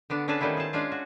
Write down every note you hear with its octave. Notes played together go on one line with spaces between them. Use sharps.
D3 B3 D4
C#4 D4 G#4 A4 B4 A5
D#3 G3 A3 B3 E4 F4
G#4 C5 A5
G#3 C#4 D4 F4 G#4
F#4